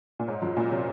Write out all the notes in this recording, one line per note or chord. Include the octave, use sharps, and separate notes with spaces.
A#2
G#2 C#5
F#2 F4
A#2 F4
C3 C#5